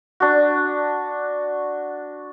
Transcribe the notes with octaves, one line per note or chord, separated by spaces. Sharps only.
D4 F#4